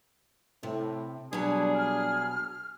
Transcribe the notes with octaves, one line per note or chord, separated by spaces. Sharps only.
A2 C3
B2 F#3 G3 D4 G#4
F6